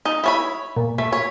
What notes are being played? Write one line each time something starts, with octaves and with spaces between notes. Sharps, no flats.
D#4
E4 C#5 B5
A#2
A3 B6
C#5